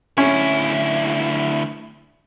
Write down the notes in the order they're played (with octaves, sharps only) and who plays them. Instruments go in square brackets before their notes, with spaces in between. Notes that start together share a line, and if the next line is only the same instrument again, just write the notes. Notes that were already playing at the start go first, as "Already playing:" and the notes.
[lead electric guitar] D2 E4 [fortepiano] C#4